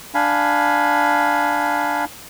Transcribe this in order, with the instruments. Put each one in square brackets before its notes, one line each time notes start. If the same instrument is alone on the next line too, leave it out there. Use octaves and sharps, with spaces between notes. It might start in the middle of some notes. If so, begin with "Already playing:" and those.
[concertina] D4 F5 G#5 B5